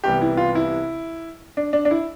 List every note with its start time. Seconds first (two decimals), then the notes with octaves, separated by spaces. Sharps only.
0.04 C2 C3 E3 G3 B3 G4
0.21 E4
0.37 F4
0.55 E4
1.57 D4
1.73 D4
1.85 D4
1.91 E4